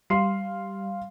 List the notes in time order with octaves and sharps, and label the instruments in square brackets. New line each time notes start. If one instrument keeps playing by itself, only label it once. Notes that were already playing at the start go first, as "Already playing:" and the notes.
[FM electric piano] G3 [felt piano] F5 C6 C7